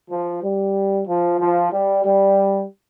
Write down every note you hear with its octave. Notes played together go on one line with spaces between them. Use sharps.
F3
G3
F3
F3
G3
G3